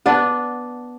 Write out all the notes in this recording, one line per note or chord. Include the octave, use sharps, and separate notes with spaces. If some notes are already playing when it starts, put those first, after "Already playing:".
B3 D4